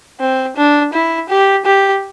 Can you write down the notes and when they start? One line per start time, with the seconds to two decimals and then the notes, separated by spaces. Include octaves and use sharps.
0.20 C4
0.57 D4
0.93 E4
1.30 G4
1.65 G4